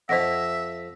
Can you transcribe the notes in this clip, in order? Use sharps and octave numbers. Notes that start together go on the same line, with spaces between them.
F2 F3 C5 D#5 E5 F#5 A#6 B6